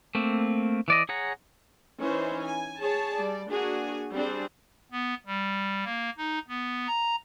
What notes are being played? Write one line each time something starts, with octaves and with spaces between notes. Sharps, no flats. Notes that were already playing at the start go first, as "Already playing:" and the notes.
A3 A#3 C4
E3 D5 D#5
G#4 C#5 F#5 A#5
E3 C#4 D#4 C5
G#5
G#4 C#5 A5
G3 D5
A#3 D4 F#4 G#4 G#5
G3 C4 D4 G#4 C5
B3
G3
A#3
D#4
B3
A#5